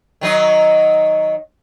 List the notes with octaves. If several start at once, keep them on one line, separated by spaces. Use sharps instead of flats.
D#3 F#3 D#4